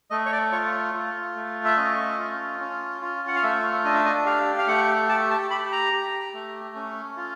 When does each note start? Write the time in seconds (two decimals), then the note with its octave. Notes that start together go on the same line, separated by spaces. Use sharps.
0.11 A3 D#5
0.26 C#5
0.32 D5
0.52 F4 C#5
0.94 F4
1.36 A3
1.65 E5
1.77 C#4 D#5
2.18 F4
2.60 C#4
3.02 F4
3.28 F#5
3.35 F5
3.43 A3 E5
3.84 D4 D#5
3.95 E5
4.06 D#5
4.26 G4 F5
4.58 F5
4.68 A3 F#5
5.09 G4 A5
5.31 A5
5.50 G4 B5
5.72 A#5
5.93 G4
6.34 A3
6.76 C#4
7.17 F4